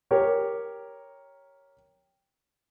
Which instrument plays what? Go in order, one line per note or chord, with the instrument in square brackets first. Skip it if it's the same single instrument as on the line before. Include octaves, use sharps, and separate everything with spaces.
[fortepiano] G4 A#4 C#5